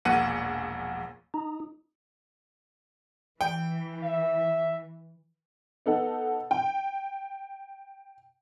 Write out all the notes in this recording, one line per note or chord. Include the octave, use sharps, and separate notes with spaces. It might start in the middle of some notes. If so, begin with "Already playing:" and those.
E1 A#1 A#2 A#3 F#5 D#7
D#4
E3 G5
E5
B3 D#4 A4 F#5
G5